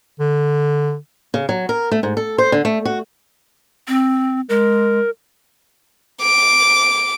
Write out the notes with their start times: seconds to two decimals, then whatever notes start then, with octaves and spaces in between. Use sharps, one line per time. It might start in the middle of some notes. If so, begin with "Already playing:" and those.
0.20 D3
1.34 C#3
1.49 F#3
1.69 A#4
1.91 A3
2.03 G#2
2.17 A4
2.38 C5
2.52 D3
2.65 A3
2.85 F#4
3.88 C4
4.49 G#3 A#4
6.21 D6